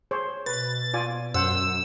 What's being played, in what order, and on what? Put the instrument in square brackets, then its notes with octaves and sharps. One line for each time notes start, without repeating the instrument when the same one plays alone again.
[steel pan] G#4 C5 C#5
[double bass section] B2 [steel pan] B4 [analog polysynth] A6
[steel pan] F4 D5 G#5
[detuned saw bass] F#2 [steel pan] C5 F#5 [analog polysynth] E6